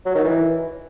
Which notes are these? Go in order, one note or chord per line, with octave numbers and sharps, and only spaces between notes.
F#3
D#3
E3